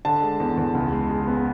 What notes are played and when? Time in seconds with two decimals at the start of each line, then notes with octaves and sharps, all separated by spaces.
0.05 D3 A5
0.22 G#3
0.40 E2
0.57 E2
0.75 C#2
0.92 G#3
1.10 G#3
1.27 B3